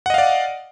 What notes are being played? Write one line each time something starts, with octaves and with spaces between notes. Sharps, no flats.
D5 D#5 F5 F#5